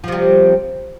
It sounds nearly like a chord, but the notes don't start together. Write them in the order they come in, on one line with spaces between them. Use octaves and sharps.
F3 C3 G3